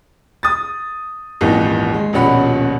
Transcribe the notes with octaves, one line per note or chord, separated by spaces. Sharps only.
D#6 A6
D#1 G#1 D#2 E3 D#4
G#3
D#1 A#1 B2 C#4 F#5 B5